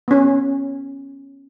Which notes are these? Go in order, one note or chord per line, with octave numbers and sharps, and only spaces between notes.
B3 C#4